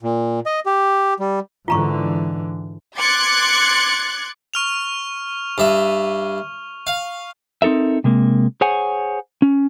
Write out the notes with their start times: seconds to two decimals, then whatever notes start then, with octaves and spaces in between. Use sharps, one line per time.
0.03 A#2
0.46 D#5
0.66 G4
1.19 G3
1.68 G#2 D3 E3 F4 A#5 C#6
2.98 C6 D6 F#6 G#6 A6 C#7
4.54 C#6 F6 F7
5.58 G2 E5
6.87 F5
7.62 C4 D#4 A4 A#4 E5
8.04 C3 G#3 A#3
8.61 G#4 C5 C#5 F#5 G#5
9.42 C#4